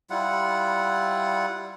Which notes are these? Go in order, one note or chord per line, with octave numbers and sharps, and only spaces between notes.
G3 E4 F4 F#5